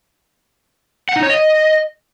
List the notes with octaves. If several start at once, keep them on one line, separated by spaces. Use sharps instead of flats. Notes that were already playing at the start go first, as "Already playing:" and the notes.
F#5
D#4
C#5
D#5